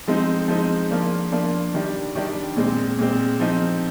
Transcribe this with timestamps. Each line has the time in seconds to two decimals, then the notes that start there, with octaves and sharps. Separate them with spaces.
0.07 F3 G#3 C4 D#4
0.48 F3 G#3 C4 D#4
0.91 F3 A#3 D4
1.32 F3 A#3 D4
1.74 D#3 G3 D4
2.15 D#3 G3 D4
2.56 A#2 G#3 C4
2.99 A#2 G#3 C4
3.40 F3 C4 D#4